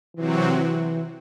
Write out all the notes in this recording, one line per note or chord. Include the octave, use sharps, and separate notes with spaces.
C3 E3 F#3 C4 F#4
E3